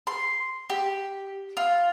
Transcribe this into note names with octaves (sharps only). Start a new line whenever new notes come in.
C6
G4
F4